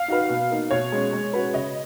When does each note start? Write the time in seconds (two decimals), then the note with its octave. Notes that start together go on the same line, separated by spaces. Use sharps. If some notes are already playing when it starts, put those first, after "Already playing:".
Already playing: F5
0.08 D#4 F#4 B4
0.29 B2
0.50 A#3 D#4
0.71 B2 C#5
0.92 G#3 C#4
1.13 G#3
1.33 C#4 F#4 B4
1.54 C#3 D#5